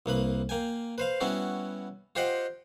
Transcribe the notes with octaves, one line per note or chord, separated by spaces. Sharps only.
C2 A#3 B4 B5
A#3 G5 G#5
B4 C5 F5
G3 B3 C#4 E4 F#4
F4 G4 C5 D#5 F#5 G5